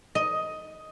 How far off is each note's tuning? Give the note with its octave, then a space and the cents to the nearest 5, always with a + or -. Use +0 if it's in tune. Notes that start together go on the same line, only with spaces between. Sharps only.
D#5 +10